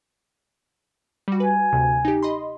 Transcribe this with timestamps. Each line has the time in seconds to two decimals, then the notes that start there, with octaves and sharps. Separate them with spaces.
1.28 G3 F#4
1.40 B4 G#5
1.73 D2 C3
2.05 D#4 G4
2.23 D#5 B5 C6